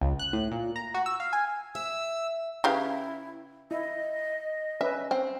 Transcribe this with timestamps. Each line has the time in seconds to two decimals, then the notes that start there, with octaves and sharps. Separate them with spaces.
0.01 C#2
0.19 F#6
0.33 A2
0.51 A#2
0.76 A#5
0.94 F#4
1.06 E6
1.20 F5
1.33 G#5
1.75 E5 E6
2.64 C#3 E4 G4 B4 F5
3.71 E4 D#5
4.81 C#4 B4 E5
5.11 C4